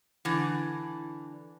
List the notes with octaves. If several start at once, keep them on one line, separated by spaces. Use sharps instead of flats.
D3 E3